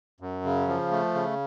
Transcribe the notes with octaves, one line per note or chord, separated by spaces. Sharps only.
F#2
C#3
F3
A3
C#3